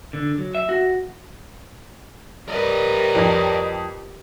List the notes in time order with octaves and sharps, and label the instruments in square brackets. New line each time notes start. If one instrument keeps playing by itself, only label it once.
[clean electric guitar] D3
F#3
E5
F#4
[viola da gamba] G3 [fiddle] A#4 B4 [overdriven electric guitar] D5 D#5
[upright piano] F2